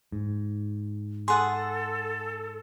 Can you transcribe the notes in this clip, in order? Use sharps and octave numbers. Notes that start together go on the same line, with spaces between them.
G#2
G#4 A4 F#5 C6 D#6